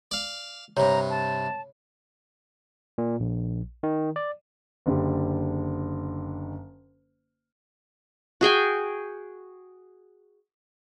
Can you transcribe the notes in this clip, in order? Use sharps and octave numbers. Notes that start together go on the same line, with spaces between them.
D5 F5
G2 C3 C#5 A#5
A5
A#2
A#1
D#3
D5
F#1 D3 D4 G4
F#4 G#4 G5 G#5